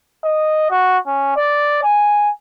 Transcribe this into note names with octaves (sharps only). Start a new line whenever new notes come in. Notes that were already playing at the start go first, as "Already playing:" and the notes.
D#5
F#4
C#4
D5
G#5